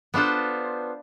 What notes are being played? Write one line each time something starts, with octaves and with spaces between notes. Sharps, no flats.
B3 D4 F4 A4 C5